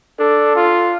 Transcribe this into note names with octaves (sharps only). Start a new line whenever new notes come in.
D4 A4
F4